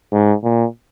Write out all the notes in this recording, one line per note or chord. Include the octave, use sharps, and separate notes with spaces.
G#2
A#2